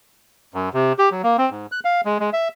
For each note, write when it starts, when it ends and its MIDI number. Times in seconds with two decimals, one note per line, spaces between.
0.54 0.69 42
0.73 0.93 48
0.99 1.09 67
1.11 1.22 54
1.23 1.37 58
1.38 1.50 60
1.51 1.66 44
1.72 1.80 90
1.85 2.01 77
2.05 2.18 56
2.20 2.30 56
2.33 2.48 76